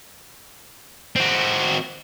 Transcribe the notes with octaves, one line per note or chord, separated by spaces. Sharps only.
C4 F#4